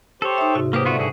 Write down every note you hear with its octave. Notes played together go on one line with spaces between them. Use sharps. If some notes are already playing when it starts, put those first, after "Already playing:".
G4 A4 C5 C#5
D#4 E5
D2 G#2 C3 F#4
G#2 F#3 A#3 G4 B4 C5 D#6
G2 D3 A3 B3 F4 F#4
E4 F#4 G#4